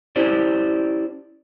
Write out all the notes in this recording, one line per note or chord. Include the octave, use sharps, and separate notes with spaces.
C#4 E4 G4 C5 D5